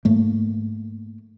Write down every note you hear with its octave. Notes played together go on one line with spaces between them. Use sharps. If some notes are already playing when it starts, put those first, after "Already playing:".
G#2 A3 A#3